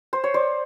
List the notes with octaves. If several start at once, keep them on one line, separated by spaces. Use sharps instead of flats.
C5
C#5
C5 D5